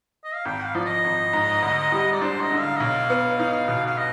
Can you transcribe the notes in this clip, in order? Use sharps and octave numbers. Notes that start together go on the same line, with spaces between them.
D#5
F5
G#1 G5
F5
F3 D5
D#5
G#1
G#2
D2
G3
D5
D4 C5
D#5
D3
F5
D#5
B1 F5
B3
D#4
B2
F5
D#5